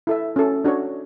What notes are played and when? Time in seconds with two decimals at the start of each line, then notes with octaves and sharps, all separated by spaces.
0.07 E4 A4 E5
0.36 C#4 F#4 A4
0.64 D4 F#4 C#5